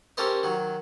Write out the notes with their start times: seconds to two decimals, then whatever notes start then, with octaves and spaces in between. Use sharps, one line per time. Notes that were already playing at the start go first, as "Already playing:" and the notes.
0.17 C#4 G4 A4 A#4 C5 D#5
0.43 D#3 F#3